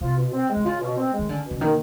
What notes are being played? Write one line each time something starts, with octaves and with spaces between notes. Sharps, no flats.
C3 F4
B2
C4
G#3
D3
C#3 F4
B2
C4
G#3
D#3
D3 C#4
B2
D3
D#3 A#3